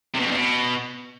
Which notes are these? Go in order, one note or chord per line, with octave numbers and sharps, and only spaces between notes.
C3
B2
F2
E2
B2